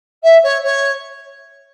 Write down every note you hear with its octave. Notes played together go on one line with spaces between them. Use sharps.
E5
C#5
C#5